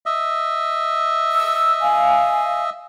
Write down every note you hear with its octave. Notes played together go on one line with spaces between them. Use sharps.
D#5 E5
E6
F5 G#5